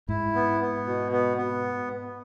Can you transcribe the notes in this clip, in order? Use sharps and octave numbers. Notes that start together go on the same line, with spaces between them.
G#2 E4
B3
B3
B2
B3
B3